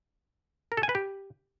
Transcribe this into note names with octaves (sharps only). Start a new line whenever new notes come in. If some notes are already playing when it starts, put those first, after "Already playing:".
A#4
A4
G#5
B4
G4